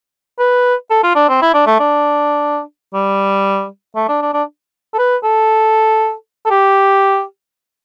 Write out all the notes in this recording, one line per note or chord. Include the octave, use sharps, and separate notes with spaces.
B4
A4
F4
D4
C4
E4
D4
A3
D4
G3
A3
D4
D4
D4
A4
B4
A4
A4
G4